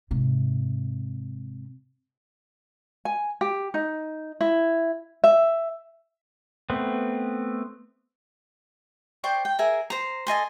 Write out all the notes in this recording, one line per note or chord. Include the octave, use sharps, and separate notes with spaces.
G#2 C3
G#5
G4
D#4
E4
E5
A3 B3 C4
C5 D5 G5 C#6
G5
G#4 A#4 E5 G#5
C5 A#5
A4 D#5 G#5 C6